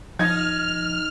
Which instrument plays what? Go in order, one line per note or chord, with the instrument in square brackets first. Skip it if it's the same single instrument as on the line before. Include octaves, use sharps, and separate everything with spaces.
[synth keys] F3 [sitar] D#4 [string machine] F6 [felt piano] G#6